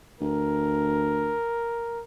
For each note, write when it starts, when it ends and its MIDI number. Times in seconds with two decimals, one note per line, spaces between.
0.21 1.37 38
0.21 2.02 70